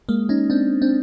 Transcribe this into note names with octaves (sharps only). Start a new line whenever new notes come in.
G#3 A#3
C#4 D#4
C4 D4
C4 D4